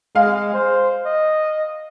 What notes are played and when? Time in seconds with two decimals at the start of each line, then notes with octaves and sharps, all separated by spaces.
0.15 G#3 F5
0.54 C5
1.06 D#5